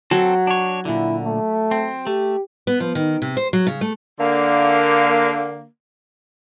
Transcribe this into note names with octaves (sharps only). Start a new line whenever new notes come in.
F#3 C4 A4
D4 C#5
A#2 D3 E4
A3
C4
A3 G4
B3
F3
D#3
C3
C5
F#3
C#3
A3
D3 A#3